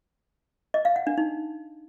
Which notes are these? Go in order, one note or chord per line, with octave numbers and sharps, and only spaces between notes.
D#5
F5
F#5
D4
D#4